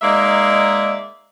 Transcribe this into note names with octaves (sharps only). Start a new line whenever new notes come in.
G#3 A#3 D#4 D5 E5